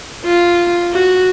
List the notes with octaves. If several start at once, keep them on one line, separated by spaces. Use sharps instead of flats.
F4
F#4